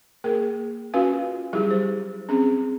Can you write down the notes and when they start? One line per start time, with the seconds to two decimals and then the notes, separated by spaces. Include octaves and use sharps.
0.24 A#3 G#4 A#4
0.94 C#4 F4 F#4 B4 F5 G#5
1.53 F#3 G3 E4 G4 G#4
1.71 C5
2.29 C4 C#4 G#4